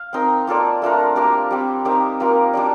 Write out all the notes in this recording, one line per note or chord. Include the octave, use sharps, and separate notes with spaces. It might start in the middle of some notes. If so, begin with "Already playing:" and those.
Already playing: F5
C4 D#4 A#4
A#3 F4 A4 D5
A3 D4 F4 A#4
A#3 D4 G4 A#4
G3 C4 G4
C4 D#4 G4 A#4
G3 A#3 F4 A#4
G3 D4 G4 D5